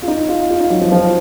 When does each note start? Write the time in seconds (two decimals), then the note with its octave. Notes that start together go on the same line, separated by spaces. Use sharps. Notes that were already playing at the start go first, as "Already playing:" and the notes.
0.02 F4
0.08 D#4
0.28 F4
0.50 F4
0.60 D#4
0.70 F#3
0.81 F3
0.92 F3